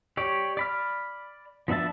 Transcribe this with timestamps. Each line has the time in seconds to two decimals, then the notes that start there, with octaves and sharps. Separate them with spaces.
0.17 G4 C#5 D5
0.57 D5 B5 F6
1.68 F3 B3 D4 E5 A5